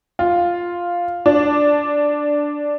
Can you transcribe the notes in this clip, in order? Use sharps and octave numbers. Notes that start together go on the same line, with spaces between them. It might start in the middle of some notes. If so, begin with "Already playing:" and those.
F4
D4